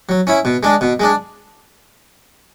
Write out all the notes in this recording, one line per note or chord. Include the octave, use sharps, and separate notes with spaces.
F#3
C#4 E4
B2
G#3 D4
B2
G#3 D4